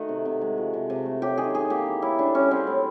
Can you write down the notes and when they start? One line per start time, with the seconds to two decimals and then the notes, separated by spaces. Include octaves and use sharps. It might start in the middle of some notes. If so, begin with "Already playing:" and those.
Already playing: D#3 A3 F#4
0.09 C3
0.25 C3
0.41 G#3
0.58 F3
0.74 C3
0.90 C3
1.06 A3
1.22 F#3 G4
1.38 D#3 G#4
1.54 D#3 G#4
1.70 A#3 G4
1.86 E3
2.02 A2 E4
2.19 A2 D4
2.34 G3 C#4
2.51 F#3 C4
2.67 A2